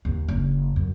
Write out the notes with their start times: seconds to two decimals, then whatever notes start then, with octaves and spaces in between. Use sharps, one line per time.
0.05 D#2
0.28 F#1
0.76 F#2